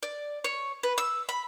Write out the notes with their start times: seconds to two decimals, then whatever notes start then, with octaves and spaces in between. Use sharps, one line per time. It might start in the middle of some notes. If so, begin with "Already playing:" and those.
0.03 D5
0.44 C#5
0.83 B4
0.98 E6
1.29 B5